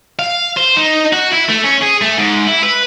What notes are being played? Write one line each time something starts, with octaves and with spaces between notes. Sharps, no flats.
F5
C5
D#4
F#4
E4
A3
C#4
G#4
A3
G#2
E4
B4